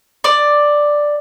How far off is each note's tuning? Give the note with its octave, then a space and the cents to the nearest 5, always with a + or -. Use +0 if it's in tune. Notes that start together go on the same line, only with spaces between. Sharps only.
D5 +5